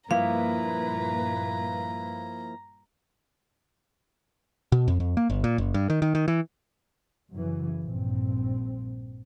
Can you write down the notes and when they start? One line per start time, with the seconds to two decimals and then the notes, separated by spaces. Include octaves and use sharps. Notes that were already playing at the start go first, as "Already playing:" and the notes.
0.11 G2 A#2 F3 A#3 E4 B4 F5 A#5
4.72 B2
4.88 F2
5.00 F2
5.17 A#3
5.30 G1
5.44 A#2
5.58 F#1
5.74 G2
5.90 D#3
6.02 D#3
6.15 D#3
6.28 E3
7.32 F#2 C#3 E3
7.81 A#1 G2 C4